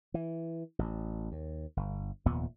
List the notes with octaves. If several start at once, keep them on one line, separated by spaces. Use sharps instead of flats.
E3
A1
D#2
G1
F1 D#2 A#2 B3